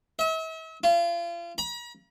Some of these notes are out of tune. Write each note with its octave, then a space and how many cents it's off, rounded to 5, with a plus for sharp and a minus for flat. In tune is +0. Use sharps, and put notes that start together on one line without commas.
E5 -40
F4 -35
A#5 +45